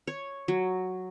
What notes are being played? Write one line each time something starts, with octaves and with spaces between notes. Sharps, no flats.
C#5
F#3